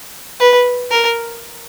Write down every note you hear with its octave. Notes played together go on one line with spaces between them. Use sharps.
B4
A#4